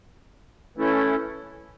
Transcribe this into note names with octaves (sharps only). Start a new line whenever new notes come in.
E3 A3 C#4 E4 A4